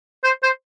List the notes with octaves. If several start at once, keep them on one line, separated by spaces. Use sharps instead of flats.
C5
C5